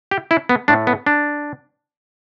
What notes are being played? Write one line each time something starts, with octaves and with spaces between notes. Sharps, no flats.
G4
E4
B3
A2 A3 D4
B3
D4